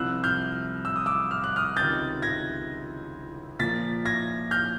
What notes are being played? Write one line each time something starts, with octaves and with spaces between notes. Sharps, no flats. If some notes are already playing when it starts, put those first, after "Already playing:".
Already playing: C2 C3 F3 E6 F#6
F6 G6
E6
D#6
D6 E6
F6
F#6
D#6 F6
C#2 C3 D#3 G6 A6
G#6 A#6
A#2 F3 A#3 A6 B6
G#6 A#6
F6 G6